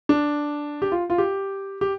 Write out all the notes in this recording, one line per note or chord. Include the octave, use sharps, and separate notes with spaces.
D4
G4
F4
F4
G4
G4